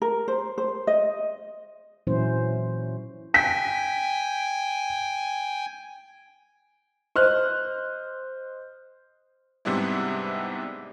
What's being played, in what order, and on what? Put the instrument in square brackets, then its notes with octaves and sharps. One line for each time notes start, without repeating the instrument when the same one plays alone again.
[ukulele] A#4
C5
C5
D#5
[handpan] A#2 E3 F#3 C#4 E4 C5
[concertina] G5 G#5 [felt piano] B6
[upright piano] C5 D#5 F6 F#6
[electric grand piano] G#2 C3 G3 B3 D4 E4